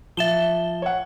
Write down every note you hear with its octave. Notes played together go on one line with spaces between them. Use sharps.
F3 E5 E7 G7
C#5 F#5